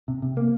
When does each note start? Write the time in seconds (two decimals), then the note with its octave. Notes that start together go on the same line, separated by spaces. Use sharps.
0.08 C3
0.22 C3
0.37 A#3